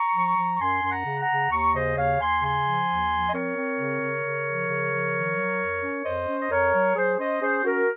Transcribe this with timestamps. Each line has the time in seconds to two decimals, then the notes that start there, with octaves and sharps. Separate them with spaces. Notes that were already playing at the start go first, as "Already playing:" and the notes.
Already playing: A#5 C#6
0.15 F3
0.37 F3
0.56 C#6
0.60 F#2 G#5 C6
0.83 F#2
0.90 F#5 A#5
1.06 C#3
1.21 F#5 A#5
1.29 C#3
1.51 D#2 A#5 C#6
1.73 C#3 C5 D#5
1.96 D#2 C#5 F5
2.19 D#2 G#5 C6
2.41 C#3 G#5 C6
2.65 F3
2.88 D#2
3.10 F3
3.26 D#5
3.33 C4 A#4 C#5
3.56 C4
3.78 C#3
4.01 C#3
4.23 C#3
4.46 F3
4.69 C#3
4.92 F3
5.14 D#3
5.37 F#3
5.60 F2
5.83 C#4
6.05 F2 C5 D#5
6.28 C#4
6.40 D#5
6.51 F2 A#4 C#5
6.74 F#3
6.96 F#3 G#4 C5
7.19 C#4 C5 D#5
7.41 C#4 G#4 C5
7.64 C#4 F#4 A#4